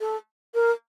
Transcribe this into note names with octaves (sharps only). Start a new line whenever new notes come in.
A4
A#4